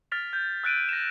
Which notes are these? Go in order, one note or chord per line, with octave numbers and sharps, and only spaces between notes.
F6 A6 B6 F7
G6
E6 F#6 A6 D7 D#7
A#6 E7